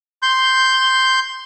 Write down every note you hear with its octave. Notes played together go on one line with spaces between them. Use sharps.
C6 G6